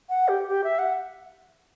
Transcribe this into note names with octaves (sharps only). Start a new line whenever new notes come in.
F#5
G4
G4
E5
F#5